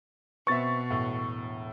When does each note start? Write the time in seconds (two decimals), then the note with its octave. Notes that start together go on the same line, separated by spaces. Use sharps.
0.47 B2 B3 C4 E5 C#6 A6
0.90 E1 A2 F#5